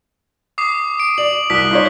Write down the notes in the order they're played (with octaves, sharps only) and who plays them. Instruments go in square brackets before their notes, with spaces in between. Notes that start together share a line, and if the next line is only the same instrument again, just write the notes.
[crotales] D6 D#6 C7
D7
[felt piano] D5 [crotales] F#7
[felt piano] C2 [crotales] F#6 B6
[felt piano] D#4 F4 C#5